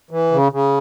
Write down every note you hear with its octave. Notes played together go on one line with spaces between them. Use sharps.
E3
C#3
C#3